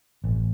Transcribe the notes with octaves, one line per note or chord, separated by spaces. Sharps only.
A1